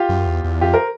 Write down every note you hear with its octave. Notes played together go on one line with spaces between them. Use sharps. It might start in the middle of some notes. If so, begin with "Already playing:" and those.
Already playing: F4 G4
F#2
E2
E2
F2 F4 G4
A#4 C5